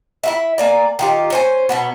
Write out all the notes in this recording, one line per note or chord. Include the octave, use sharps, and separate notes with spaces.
E4 F4 E5
A#3 D5 G#5
D#3 F4 G4
C#4 C5 G#5
B2 F#3 B3